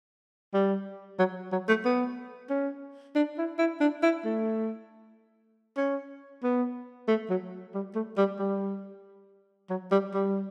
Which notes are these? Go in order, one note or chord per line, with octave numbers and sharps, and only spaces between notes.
G3
F#3
F#3
A3
B3
C#4
D4
E4
E4
D4
E4
A3
C#4
B3
A3
F#3
G3
A3
G3
G3
F#3
G3
G3